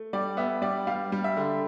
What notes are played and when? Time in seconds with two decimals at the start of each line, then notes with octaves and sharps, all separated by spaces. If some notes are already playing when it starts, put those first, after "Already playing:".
Already playing: A3
0.13 G3 D5
0.37 B3 E5
0.62 G3 D5
0.87 G3 F5
1.12 G3
1.24 E5
1.37 D3